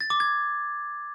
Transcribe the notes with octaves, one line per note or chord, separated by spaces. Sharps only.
A6
D6
G#6